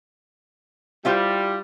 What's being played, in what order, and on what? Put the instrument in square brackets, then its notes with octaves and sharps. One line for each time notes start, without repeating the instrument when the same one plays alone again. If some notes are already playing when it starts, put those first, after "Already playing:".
[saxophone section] G3 [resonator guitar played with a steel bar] E4 F4 C5